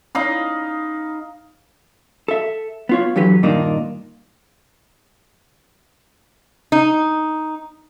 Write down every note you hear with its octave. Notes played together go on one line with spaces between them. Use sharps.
D#4 D#5 F5 B5
A4 E5
B3 F4 C#5
D3 E3 F#3 G4 B4
G2 A#2 D#3 A#3 D4 D#4
D#4